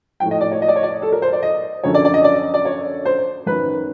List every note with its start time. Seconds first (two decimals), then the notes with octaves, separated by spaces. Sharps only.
0.20 A2 F3 G5
0.31 D#5
0.41 D5
0.52 C#5
0.62 D#5
0.68 D5
0.76 C#5
0.83 D5
1.02 A4
1.12 A#4
1.22 C5
1.33 D5
1.43 D#5
1.84 F#2 D3 F3 C#5
1.94 D5
2.05 D5
2.14 D#5
2.24 D5
2.54 D5
2.65 C#5
3.05 C5
3.46 F#2 D#3 B4